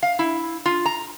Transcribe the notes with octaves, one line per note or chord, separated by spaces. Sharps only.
F5
E4
F4
A#5